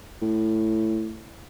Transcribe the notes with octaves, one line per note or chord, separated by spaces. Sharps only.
A2